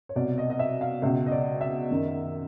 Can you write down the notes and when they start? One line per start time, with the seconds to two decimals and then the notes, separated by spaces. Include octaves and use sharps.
0.09 C#5
0.16 C2 B2 D5
0.38 D#5
0.50 D#5
0.59 E5
0.81 F5
1.02 C#2 B2 E5
1.26 D#5
1.32 D5
1.61 E5
1.91 F#2 D#3